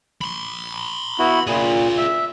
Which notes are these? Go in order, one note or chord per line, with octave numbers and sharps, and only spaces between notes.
B5 C6
B3 E4 F#4
A#2 F4 G#4
E5